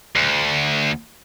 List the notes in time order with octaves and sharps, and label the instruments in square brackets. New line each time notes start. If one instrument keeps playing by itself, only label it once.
[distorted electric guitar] D2